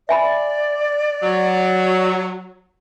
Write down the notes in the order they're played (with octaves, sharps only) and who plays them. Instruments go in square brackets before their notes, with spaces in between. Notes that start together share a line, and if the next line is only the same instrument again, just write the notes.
[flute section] D5 [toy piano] E5 G#5 B5
[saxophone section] F#3